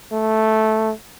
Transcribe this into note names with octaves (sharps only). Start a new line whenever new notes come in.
A3